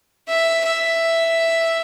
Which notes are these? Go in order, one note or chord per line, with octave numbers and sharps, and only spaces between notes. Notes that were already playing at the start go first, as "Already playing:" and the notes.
E5
E5